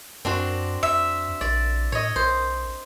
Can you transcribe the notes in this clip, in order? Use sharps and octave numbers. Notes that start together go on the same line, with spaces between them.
F#2 C4 D4 F#4
F2 E5
A#1 D5
A2 C#5 D#5
B1 C5